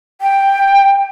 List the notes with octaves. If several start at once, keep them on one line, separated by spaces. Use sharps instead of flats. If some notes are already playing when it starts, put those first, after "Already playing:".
G5